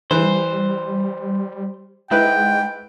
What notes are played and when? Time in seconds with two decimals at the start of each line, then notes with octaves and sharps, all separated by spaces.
0.11 E3 G3 C5
2.11 G#2 G#3 E4 B4 G5